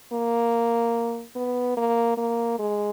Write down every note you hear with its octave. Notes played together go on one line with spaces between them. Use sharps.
A#3
B3
A#3
A#3
G#3